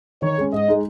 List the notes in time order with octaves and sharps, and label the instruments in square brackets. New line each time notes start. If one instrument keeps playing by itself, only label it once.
[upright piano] D#3 [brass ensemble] C#5
[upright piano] G#3 C#4
[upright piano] G#2 [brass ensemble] D#5
[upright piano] G#3 D#4